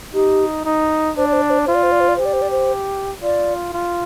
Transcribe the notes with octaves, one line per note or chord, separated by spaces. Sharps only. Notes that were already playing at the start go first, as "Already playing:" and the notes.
D#4 G4
D#4
D4 C5
D5
C5
D5
C5
D5
F4 C5
D5
C5
D5
C5
D5
C5
G4
D5
C5
D5
C5
F4 D5
F4